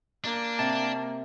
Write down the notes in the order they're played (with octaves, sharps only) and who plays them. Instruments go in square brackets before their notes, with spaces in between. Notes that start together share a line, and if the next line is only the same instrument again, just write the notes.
[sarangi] A#3 [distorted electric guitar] D4
[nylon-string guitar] C3 [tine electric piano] A5